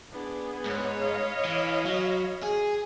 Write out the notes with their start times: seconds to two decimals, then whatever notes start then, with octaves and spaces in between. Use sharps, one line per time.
0.12 B3 D4 G#4
0.66 G#2 C#5 B5
1.01 D#5 F5
1.45 E3
1.86 F#3
2.43 G#4